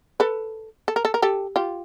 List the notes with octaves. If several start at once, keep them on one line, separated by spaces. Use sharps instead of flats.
A4 B4
A4
A#4
A4
A#4
G4 A4
F4 G4